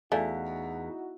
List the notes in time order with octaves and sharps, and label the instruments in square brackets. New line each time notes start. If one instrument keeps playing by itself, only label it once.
[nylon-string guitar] E2 [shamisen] A3 [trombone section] D#4 E4 F#4 [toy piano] D5 F5 G#5